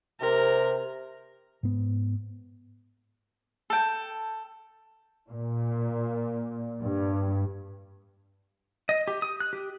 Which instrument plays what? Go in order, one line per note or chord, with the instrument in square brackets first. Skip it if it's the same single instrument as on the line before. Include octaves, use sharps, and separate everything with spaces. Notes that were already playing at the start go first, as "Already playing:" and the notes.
[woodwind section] C3 [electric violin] A#4
[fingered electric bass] G#2 B3
[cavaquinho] A4 G5
[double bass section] A#2
G2
[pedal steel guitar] D#5
G4
D#6
F#6
G4